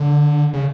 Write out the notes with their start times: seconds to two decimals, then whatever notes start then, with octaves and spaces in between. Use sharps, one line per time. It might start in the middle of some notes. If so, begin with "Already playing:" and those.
Already playing: D3
0.54 C#3